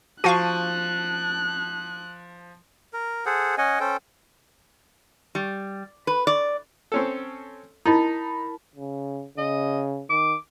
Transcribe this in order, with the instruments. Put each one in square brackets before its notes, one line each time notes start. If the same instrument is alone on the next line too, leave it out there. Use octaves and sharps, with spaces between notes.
[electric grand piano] F3 A5 D#7 [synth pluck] F#4 F5 C#6 [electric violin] F#6
[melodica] A#4
G#4 A4 C5 F#5
C#4 D#5 F#5 G#5
C#4 A4 C5 G5
[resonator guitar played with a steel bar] G3
B4
D5
[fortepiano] C4 C#4 A4
[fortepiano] D#4 [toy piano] E4 [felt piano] A#4 A5 B5
[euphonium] C#3
[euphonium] C#3 [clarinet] D#5
[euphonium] D#3 [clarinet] D6